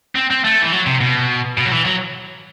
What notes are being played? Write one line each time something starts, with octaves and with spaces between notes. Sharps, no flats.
C4
C4
A3
E3
F#3
C3
B2
B2
F#3
E3
F#3